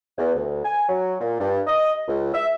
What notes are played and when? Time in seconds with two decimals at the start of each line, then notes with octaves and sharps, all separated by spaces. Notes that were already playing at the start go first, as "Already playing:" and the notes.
0.18 E2
0.34 D2
0.65 G#5
0.88 F#3
1.21 A#2
1.39 G2
1.67 D#5
2.08 C#2
2.34 E5